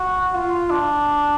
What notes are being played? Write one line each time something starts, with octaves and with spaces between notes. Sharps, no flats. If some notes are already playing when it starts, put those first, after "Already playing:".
Already playing: F#4
F4
D4